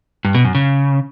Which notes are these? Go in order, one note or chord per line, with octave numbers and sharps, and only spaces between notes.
G2
B2
F#2
C#3